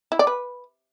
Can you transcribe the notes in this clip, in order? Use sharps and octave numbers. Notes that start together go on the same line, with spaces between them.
E4
D5
B4